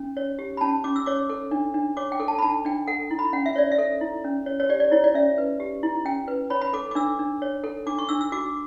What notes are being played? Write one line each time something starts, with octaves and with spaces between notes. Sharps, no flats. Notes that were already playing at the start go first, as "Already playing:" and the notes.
Already playing: C#4
C#5
G4
B5
C#4 A5
C#4 D6
E6
C#5 D6
A4
D4
D4
C#5 D6
G5
A4
A5
B5
D4 A5
D4 G5
A4 F#5
E4
B5
C#4 F#5
E5
C#5 D5
E5
A4
E4
C#4
C#5
C#5
G4 D5
D5
E4 C#5
D5
C#4 E5
B4
G4
E4
C#4 G5
B4
C#5 B5
B5
A4 D6
D6
D4 E6
D4
C#5
A4
D4 D6
C#6
D4 E6
E6
F#4 D6